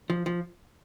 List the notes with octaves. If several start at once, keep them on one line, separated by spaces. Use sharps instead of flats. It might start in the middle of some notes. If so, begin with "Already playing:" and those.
F3
F3